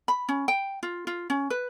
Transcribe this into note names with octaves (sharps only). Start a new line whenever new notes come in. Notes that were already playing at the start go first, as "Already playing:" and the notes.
B5
C#4
G5
F4
F4
C#4
B4